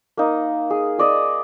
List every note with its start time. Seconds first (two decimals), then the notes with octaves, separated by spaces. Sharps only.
0.17 A#3 D#4
0.70 G#4
0.98 G#4 D5 D#5